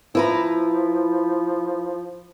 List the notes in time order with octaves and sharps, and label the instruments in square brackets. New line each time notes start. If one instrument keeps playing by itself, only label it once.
[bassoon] F3 [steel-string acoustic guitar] E4 B4 A#5